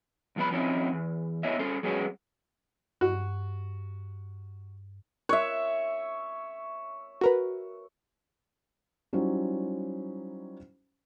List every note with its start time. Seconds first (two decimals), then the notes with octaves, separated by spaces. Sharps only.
0.36 C2 F3 B3 B5
0.51 F3 C4 C#4 D#4 E4
0.93 E2
1.43 B3 E4 C#5 D#5 E5
1.59 C#4 A4 C5
1.83 F#3 G#3 B3 C#4 F#4
3.01 G2 F#4
5.29 C#5 E5 F#6
7.21 F#4 A#4 B4
9.13 F#3 G3 C#4 D#4 E4 C5